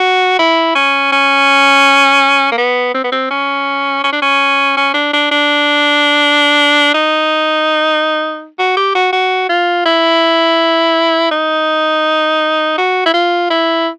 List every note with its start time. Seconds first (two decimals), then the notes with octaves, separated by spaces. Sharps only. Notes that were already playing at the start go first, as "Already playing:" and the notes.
Already playing: F#4
0.39 E4
0.75 C#4
1.12 C#4
2.52 A#3
2.58 B3
2.94 C4
3.04 B3
3.12 C4
3.31 C#4
4.04 C#4
4.12 D4
4.22 C#4
4.77 C#4
4.94 D4
5.13 D4
5.31 D4
6.94 D#4
8.59 F#4
8.77 G4
8.95 F#4
9.12 F#4
9.49 F4
9.85 E4
11.31 D#4
12.78 F#4
13.06 E4
13.14 F4
13.50 E4